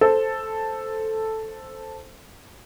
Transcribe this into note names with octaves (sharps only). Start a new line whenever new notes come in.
A4 C5